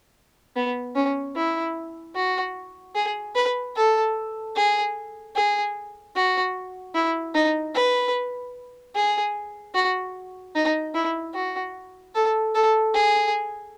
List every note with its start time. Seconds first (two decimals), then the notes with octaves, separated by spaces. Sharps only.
0.56 B3
0.95 C#4
1.36 E4
2.16 F#4
2.95 G#4
3.35 B4
3.76 A4
4.56 G#4
5.36 G#4
6.16 F#4
6.95 E4
7.35 D#4
7.75 B4
8.96 G#4
9.75 F#4
10.55 D#4
10.94 E4
11.34 F#4
12.15 A4
12.54 A4
12.94 G#4